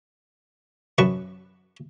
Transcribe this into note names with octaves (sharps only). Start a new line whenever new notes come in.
F#2 F#4 B4 A5 C#6